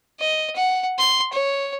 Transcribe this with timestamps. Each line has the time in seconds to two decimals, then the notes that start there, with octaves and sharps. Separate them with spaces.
0.20 D#5
0.55 F#5
0.98 C6
1.33 C#5